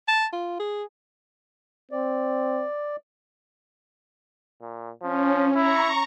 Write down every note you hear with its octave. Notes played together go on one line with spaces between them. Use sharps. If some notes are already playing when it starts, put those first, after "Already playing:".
A5
F4
G#4
C4 D5
A#2
F3 C#4
E4 A#5 C#6